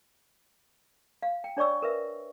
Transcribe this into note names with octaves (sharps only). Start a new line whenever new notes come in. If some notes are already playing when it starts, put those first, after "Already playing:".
F5
G5
D4 C#5 D5 C#6 E6
A#4 B4 E5